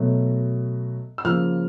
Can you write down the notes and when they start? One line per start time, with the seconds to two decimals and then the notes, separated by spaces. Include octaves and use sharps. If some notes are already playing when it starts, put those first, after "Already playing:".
Already playing: B2 F#3 A3
1.18 E6
1.25 C#3 F3 A#3 F6